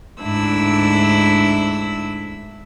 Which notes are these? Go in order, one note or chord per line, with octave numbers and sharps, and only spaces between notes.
D2 G#2 D4 E4 E6